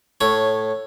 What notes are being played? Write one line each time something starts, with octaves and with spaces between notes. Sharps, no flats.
A2 C#5